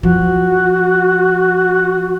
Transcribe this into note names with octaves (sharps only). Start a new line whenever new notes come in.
F3 F#4